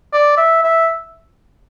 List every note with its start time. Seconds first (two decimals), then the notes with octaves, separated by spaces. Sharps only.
0.13 D5
0.37 E5
0.63 E5